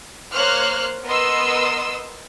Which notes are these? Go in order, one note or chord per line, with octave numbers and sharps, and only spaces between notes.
A#3 C5 C#5 F6 F#6
B3 A#4 D#5 C6 E6